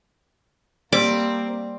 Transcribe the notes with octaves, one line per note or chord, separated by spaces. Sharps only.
G3 A#3 C4 D6